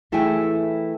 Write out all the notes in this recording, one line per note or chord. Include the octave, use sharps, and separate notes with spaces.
E3 A3 E4 G#4 G5 G#5